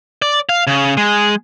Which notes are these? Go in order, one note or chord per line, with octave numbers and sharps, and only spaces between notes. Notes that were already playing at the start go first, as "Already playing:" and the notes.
D5
F5
C#3
G#3